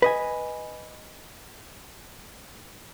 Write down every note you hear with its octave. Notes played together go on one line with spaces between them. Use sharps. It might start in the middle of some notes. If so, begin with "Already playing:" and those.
B4 D#5 G#5